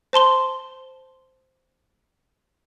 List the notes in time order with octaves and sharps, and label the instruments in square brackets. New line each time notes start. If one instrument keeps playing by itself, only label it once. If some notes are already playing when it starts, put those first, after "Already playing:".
[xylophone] C5 A5 C6 G7